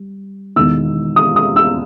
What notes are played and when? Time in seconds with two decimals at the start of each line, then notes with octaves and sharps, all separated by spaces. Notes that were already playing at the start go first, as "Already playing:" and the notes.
Already playing: G3
0.56 E1 E2 D#3 E6
1.16 D#6
1.36 D#6
1.56 E6